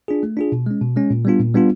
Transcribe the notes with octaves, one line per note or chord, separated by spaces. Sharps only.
D4 F4 G#4
A3
D4 F4 G#4
B2
G#3 C#4
B2
G#3 C#4
A#2
G3 B3 D4 F4
A#2
G3 B3 D4 F4